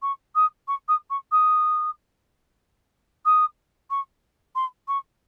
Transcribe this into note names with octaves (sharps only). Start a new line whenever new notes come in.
C#6
D#6
C#6
D#6
C#6
D#6
D#6
C#6
C6
C#6